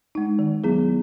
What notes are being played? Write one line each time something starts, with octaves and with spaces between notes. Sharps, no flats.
G#3 D#4
D#3
F#3 B3 E4 G#4